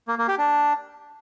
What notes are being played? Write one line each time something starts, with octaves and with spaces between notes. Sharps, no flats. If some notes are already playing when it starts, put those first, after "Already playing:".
A#3
A#3
G4
D4